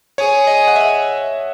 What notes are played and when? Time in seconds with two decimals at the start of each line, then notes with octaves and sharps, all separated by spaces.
0.18 G#4 C#5
0.47 D#5
0.68 F#5
0.76 E5